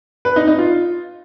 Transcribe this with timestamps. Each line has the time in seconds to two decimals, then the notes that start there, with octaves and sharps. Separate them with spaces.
0.25 B4
0.36 D#4
0.47 D#4
0.58 F4